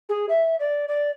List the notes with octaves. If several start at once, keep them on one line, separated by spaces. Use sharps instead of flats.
G#4
E5
D5
D5